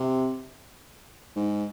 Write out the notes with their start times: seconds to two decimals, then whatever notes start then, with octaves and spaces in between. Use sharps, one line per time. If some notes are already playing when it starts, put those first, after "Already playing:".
Already playing: C3
1.36 G#2